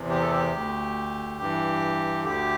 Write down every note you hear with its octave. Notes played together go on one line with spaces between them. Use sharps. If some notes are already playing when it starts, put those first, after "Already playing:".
Already playing: E2 C3 E3
G4
A4
G4
D2
D3
G2 E3
D2 D3 G4